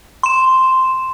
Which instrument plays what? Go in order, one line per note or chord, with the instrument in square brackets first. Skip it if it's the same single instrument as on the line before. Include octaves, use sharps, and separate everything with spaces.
[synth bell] C6 E7